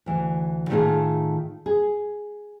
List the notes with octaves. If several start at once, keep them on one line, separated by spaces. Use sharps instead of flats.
D2 E3
A2 D#3 A3 F4 G#4 A4
G#4